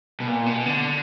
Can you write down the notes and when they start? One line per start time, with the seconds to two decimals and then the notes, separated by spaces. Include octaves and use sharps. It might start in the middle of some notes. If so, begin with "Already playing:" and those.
0.20 B2
0.27 A#2
0.46 B2
0.66 D3